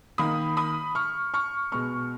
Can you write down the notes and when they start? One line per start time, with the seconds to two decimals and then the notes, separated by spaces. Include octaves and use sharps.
0.18 D#3 A#3 B5 D#6
0.57 B5 D#6
0.95 C#6 F6
1.34 C#6 F6
1.72 B2 G#3 B3 C#6 F6